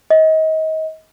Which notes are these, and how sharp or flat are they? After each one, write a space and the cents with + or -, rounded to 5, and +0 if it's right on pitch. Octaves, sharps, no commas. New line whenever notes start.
D#5 +30